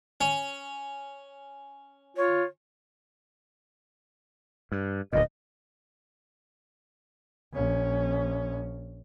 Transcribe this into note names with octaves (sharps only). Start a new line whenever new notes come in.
C#4
F4 C#5
G2
D1 D2 A#2 D#5
A#1 C#4